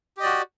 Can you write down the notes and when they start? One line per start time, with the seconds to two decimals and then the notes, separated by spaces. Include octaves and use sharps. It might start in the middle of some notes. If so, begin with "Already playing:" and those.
0.17 G4
0.20 D#5
0.23 D5
0.26 F#4